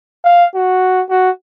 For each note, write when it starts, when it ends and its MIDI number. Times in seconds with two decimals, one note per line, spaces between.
0.25 0.46 77
0.55 1.02 66
1.10 1.30 66